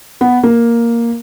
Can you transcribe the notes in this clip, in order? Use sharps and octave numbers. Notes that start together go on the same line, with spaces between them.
B3
A#3